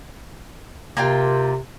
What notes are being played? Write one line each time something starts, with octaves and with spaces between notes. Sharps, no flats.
C3 A#3 F4 G5